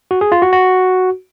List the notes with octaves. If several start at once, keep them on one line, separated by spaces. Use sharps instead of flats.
F#4
G#4
F4
F#4
F#4